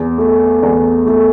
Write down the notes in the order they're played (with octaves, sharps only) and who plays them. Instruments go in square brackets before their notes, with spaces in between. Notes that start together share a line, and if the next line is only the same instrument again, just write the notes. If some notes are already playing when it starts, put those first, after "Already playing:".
Already playing: [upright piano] E2
A3
E2
A3